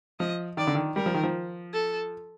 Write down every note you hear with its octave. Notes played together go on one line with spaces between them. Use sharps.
F3 D#5
D#3 D5
D3
D#3
G3 A#4
F3
D#3
F3
A4